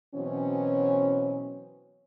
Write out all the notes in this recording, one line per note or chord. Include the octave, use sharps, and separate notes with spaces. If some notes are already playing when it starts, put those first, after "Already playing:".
B2 E3 F#3 C4 C#4